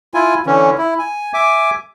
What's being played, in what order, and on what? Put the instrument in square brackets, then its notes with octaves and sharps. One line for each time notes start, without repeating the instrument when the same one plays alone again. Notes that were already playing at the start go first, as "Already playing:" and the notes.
[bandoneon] E4 F4 G#5
D3 E3 C#4
E4
G#5
E5 G#5 D6